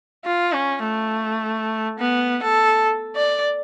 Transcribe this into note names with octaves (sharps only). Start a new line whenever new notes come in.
F4
C#4
A3
B3
A4
D5